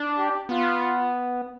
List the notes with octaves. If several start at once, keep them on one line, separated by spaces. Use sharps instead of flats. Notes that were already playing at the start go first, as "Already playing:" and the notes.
Already playing: D4
G4
B3 F4